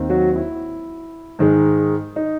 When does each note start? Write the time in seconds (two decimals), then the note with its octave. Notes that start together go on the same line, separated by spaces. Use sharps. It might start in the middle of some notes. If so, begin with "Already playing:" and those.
Already playing: D#2 D#3 C4
0.10 F#3 F#4
0.36 E4
1.39 G#2 D#3 G#3
2.16 D#4